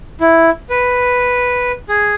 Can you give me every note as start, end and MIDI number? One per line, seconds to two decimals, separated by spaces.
0.20 0.50 64
0.70 1.72 71
1.89 2.15 68